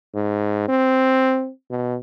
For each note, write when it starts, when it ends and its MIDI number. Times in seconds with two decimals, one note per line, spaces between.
0.14 0.68 44
0.68 1.50 60
1.71 1.97 47